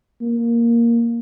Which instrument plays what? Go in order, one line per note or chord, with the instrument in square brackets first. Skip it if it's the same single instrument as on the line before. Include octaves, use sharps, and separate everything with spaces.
[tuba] A#3